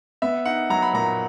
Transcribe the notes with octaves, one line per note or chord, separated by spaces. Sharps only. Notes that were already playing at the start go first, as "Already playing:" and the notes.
B3 E5
D#4 F#5
F#3 A#5
B5
A#2 A#5